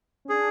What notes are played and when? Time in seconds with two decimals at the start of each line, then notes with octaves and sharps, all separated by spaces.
0.25 C#4
0.29 D4 G#4